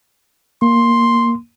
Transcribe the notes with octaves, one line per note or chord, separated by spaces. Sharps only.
A#3 C6